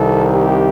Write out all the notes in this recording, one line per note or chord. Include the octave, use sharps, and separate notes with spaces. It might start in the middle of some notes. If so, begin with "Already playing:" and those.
Already playing: C2 C3 D#3 A4
G4